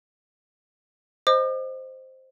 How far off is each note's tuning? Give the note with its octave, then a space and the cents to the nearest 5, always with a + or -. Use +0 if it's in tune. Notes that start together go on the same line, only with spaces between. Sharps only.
C5 +0 D#5 +0 D6 +45